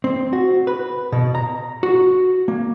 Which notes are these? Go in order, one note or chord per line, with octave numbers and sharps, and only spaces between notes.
C4
F#4
B4
B2
A#5
F#4
A#3